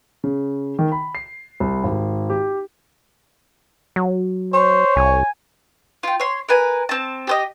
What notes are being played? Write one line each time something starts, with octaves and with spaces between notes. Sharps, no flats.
C#3
D#3
B5
C7
C2
G#1
G4
F#3
C5 C#5
C2 G#5
F4 G5
C#5 C6
A#4 B4 G#5
C4 A5
G4 C5 D#5